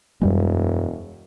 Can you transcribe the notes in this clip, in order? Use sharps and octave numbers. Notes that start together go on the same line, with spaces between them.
E1 F#2 G3 G#3